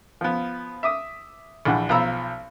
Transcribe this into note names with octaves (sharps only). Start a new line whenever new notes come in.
F3 B3
E5 D6 D#6
A#1 E3 D4 F#5
B1 F3 A#5 B5 E6